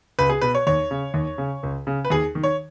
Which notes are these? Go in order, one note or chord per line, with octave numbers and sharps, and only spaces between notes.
C#2 B4
G#4
B2 B4
C#5
D#2 C#5
C#3
D#2
C#3
C#2
C#3
B4
D#2 G#4
D#3
C#5